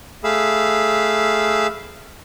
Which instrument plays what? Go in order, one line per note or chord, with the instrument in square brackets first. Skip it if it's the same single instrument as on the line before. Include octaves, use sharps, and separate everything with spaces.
[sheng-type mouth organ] A3 G#4 F5 B5 E6